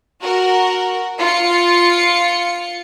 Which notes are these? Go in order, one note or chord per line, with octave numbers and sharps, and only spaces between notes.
F#4 A#4
F4 C#7